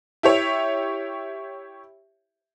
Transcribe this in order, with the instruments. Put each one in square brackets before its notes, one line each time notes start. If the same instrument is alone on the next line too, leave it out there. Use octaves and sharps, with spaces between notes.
[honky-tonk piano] E4 G4 C#5 E5